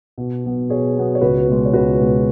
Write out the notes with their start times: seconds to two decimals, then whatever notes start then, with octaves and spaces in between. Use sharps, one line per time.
0.18 B2
0.44 F#3 B3
0.70 B2 G#4 C#5
0.96 F#3 B3
1.15 C#5
1.21 C#2 F#4 B4
1.48 B2 G#3
1.65 C#5
1.73 C#2 F#4 B4
2.00 B2 G#3